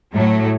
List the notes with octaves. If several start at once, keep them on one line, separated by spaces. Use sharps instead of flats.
A2 F#3 A3